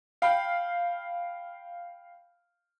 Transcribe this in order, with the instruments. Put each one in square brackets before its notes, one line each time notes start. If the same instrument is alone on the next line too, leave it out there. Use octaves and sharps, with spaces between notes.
[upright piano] F5 G5 B5